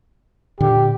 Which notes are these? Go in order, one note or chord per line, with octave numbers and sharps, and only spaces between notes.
A#2 D3 G4